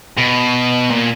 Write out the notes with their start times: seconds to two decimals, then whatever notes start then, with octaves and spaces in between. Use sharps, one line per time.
0.18 B2
0.90 A#2